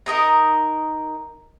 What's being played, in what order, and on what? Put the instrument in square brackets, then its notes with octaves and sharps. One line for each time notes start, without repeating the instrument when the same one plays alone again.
[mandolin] D#4 A#4 D#5 A#5